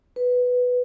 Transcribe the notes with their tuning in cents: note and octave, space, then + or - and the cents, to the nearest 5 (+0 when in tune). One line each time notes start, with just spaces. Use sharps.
B4 +0